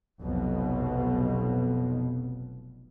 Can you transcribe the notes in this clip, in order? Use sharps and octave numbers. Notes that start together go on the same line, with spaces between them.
F1 B1 F2 B2